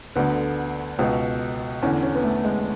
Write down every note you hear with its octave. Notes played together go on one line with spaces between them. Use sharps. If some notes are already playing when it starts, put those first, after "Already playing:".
D2 D3 B3
C#2 B2
E2 D3 C#4
C#4
B3
A3
G#3